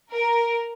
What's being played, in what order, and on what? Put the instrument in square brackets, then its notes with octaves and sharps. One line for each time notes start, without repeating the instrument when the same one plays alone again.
[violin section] A#4